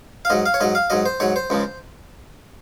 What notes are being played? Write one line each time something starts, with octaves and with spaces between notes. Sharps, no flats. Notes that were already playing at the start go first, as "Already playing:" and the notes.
F5
G#2 F#3 D#5
F5
C#5
G#2 F#3 D#5
F5
G#2 F#3 D#5
C5
G#2 F#3 C#5
C5
C#2 C#3 F3